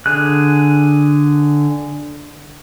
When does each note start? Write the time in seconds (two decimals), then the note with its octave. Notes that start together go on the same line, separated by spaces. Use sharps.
0.06 D3 G#4 F#6